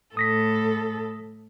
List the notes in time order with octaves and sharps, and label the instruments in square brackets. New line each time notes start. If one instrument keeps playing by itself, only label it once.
[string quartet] A2 A4 [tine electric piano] D#6 A#6 B6